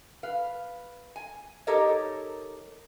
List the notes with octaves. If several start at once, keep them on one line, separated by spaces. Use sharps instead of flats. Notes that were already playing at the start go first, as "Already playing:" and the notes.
B4 F5
G#5
D#4 G4 A4 A#4 C#5 D#5